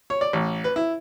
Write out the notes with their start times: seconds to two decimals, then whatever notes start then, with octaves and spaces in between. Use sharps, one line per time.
0.10 C#5
0.21 D5
0.33 A1
0.64 B4
0.76 E4